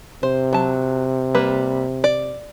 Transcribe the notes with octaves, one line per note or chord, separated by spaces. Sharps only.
C3 C5
F#3 A5
G3 A#3 B4
D5